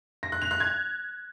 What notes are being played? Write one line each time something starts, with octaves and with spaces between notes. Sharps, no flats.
A#6
F#6
F7
F#6
G#6